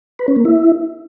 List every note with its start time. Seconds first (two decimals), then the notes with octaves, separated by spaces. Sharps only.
0.19 B4
0.28 C#4
0.36 A#3
0.45 E4